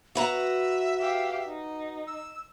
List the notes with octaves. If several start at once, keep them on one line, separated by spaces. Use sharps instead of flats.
F#4 B4 E5 A#5
G4 F5
D#4
E6